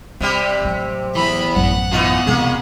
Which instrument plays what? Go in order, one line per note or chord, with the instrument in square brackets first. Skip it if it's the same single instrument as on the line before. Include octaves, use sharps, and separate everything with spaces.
[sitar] C3 G3 G4 [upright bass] C4
[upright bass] A1 F#3
[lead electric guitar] E3 B3 [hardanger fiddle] B5
[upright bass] A1 F#2 [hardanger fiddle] F#5
[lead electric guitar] B2 B3 [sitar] E3 D#4 F4
[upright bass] E2 C3 [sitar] A#3 G#4